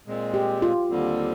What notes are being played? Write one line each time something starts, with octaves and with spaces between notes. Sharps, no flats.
A#2 G#3 C4
G4
F4
D#2 D3 G3 C4